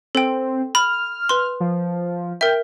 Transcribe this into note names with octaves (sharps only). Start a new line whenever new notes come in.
C4 A4 G5
B5 F6
B4 C6
F3
A#4 E5 G5